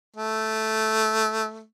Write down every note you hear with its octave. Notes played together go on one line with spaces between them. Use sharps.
A3